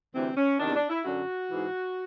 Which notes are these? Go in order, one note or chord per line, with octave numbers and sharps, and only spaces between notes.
D2 C3 E3 C4
C#4
E2 C3 D#3 D4
D4
E4
F#2 D3 F#4
G#2 E3